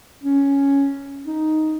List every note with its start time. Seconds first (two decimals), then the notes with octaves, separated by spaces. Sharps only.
0.23 C#4
1.26 D#4